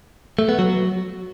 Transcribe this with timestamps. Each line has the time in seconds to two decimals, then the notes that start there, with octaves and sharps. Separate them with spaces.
0.39 A3
0.49 B3
0.59 F#3